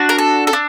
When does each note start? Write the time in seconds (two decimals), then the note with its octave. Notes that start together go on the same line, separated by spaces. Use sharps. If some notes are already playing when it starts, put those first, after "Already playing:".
Already playing: D4 F#4
0.09 A#4
0.18 A4
0.47 A4
0.53 D4